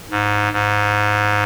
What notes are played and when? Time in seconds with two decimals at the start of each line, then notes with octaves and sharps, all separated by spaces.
0.11 G#2
0.53 G#2